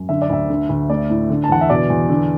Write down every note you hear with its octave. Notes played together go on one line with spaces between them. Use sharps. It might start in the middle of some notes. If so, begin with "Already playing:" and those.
Already playing: F#2
D3 E5
D5
D2 E5
D3
D2
A3 D5
A2
D3
A5
E2 F#5
E5
B2 D5
E2
D3